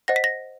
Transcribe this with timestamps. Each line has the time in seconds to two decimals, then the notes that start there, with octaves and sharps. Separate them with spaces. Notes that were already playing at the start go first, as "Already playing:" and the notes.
0.08 C5 D#5 F#5 A#6
0.16 B6
0.24 A#6